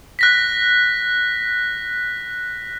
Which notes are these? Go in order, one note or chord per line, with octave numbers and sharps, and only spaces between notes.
F#6 A#6 B6